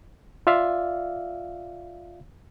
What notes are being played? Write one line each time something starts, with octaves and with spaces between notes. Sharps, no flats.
F4 D5 E5 F5